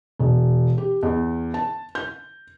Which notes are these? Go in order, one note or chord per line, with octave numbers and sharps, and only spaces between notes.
E1
G4
E2
A5
G6